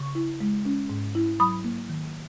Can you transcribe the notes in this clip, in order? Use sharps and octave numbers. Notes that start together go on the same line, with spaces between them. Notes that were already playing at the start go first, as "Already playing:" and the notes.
Already playing: C#3 C#6
E4
G#3
C#4
G#2
E4
F#3 B5 D#6
A#3
D#3